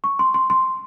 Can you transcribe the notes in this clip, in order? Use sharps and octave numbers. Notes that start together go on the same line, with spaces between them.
C#6
C6
C6
C6